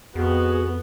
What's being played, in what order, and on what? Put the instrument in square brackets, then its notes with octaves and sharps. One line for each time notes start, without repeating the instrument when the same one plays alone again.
[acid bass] F2 [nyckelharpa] B3 [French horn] F#4 [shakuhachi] G#4